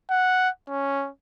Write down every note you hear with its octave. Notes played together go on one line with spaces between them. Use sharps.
F#5
C#4